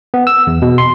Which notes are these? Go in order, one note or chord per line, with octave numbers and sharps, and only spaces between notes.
B3
E6
E2
B2
C6